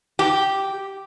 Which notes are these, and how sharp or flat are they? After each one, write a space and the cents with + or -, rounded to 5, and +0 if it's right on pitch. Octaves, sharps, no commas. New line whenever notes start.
G4 -5